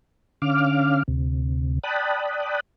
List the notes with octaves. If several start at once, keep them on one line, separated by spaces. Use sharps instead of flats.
D3 C#4 F5 D6 F6
D2 C3
D5 G5 A5 B5 D#6 F#6